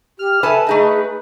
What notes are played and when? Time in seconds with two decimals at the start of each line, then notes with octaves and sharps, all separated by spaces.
0.19 G4 F6
0.43 A4 B4 E5 G#5 A5
0.67 A3 D#4 G#4 D#5